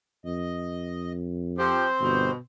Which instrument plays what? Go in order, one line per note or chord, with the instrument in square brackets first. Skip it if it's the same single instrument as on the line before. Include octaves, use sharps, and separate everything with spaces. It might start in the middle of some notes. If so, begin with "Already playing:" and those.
[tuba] F2 [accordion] D#5
[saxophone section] F3 G4 [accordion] C4 C5
[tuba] G1 [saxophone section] B2